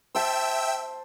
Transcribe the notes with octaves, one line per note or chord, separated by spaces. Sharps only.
C5 E5 G5 A5 E6